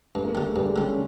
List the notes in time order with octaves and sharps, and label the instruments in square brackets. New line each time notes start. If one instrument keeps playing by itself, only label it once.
[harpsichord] G2 [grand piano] A3
[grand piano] A#3
[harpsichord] D3 G3 [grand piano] A3
[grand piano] G#3
[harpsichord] G2 [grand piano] G3
[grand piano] G#3
[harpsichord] D3 G3
[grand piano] C#4